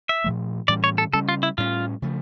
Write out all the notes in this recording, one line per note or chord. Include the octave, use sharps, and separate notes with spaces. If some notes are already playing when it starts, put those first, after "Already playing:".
E5
A#2 F3 A3
A2 E3 G3 C#4 D5
C#5
A4
C#3 G3 C#4 A4
F4
E4
A2 G3 A#3 C#4 F4
C#3 F3 A3